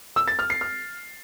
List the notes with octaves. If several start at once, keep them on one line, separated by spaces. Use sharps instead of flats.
E6
A6
F6
C7
F6